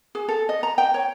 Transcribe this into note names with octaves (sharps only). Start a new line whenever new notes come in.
G#4
A4
D#5
A#5
G5
C#5